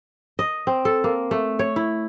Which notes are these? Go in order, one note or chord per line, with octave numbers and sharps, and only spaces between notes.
D#5
C4
A4
A#3
A3
C#5
E4